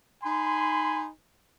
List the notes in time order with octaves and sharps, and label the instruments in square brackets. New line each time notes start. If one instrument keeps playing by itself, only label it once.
[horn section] D#4 G#5 B5 C6